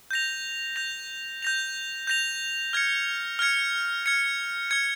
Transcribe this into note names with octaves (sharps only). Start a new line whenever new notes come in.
G6 A#6 F7
G6 A#6 F7
G6 A#6 F7
G6 A#6 F7
F6 G#6 C#7
F6 G#6 C#7
F6 G#6 C#7
F6 G#6 C#7